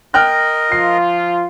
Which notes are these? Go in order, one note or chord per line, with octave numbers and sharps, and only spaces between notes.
A#4 D#5 G5 F6 F#6
F3 F4 C7